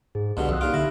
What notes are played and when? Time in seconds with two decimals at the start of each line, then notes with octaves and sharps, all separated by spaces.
0.15 G#2 G#4
0.37 C#2 G2 B2 D3
0.49 C2 F2 D#6 E6 F#6
0.61 A#2 D#4 F4 G4 D7
0.74 D3 E4 A#6